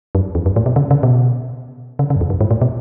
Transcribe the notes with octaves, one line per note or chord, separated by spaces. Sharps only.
F#2
E2
F#2
A2
B2
C#3
C#3
B2
C#3
C#3
F#2
E2
F#2
G#2
A2
B2